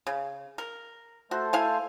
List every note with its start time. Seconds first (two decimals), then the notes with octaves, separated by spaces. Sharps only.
0.07 C#3
0.58 A#4
1.31 A3 F#4 A4 C5
1.53 E4 F5 G#5